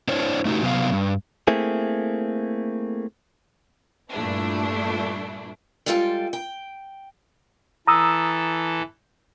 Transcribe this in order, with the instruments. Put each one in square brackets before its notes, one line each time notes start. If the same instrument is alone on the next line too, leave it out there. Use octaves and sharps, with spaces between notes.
[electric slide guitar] D4 E4 C5 C#5
A3 D#4 F#4 G4
C3 F#3 B3 A#4 F5
G2
[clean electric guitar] A3 A#3 C4 E4 G#4
[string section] G2 A#2 A3 D4 E4
[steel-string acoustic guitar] G3 G#3 F4 A4 F5 G5
G5
[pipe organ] E3 A4 [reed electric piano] A#5 D#6 E6